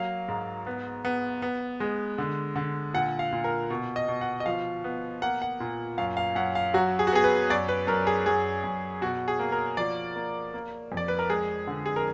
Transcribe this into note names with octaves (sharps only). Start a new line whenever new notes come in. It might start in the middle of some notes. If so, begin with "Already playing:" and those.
Already playing: F#3 A#3 F5
G#2
B3
B3
B3
G#3
D3
D3
A#2 F#5
F5
A#2
A#4
B2
D#5
B2
F#5
D#5
F3 F5
B3
A#3 F#5
F#5
A#2
F#2 F5
F5
F#2 F#5
F5
F#3 F#4
G#4
F#4
B3 G#4
B4
F#2 D5
B4
F#2 A#4
G#4
F#2 G#4
F#2
B2 F#4
G#4
A#3
A#4
F3 D5
A#3
A#3
F2
D5
B4
A#4
G#3 G#4
D3
G#4
A#4